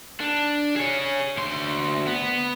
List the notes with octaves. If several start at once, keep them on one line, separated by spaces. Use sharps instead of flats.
D4
G#4 C#5
D2 C6
B3